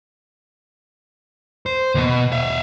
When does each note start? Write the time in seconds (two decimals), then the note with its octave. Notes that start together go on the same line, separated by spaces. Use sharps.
1.66 C5
1.95 D#2 B2
2.32 E5 F5